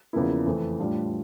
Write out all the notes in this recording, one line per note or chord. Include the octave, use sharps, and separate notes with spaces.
E2 C#3 F3 A#3 E4
F2 E3 A3
A2 G3 D4 F4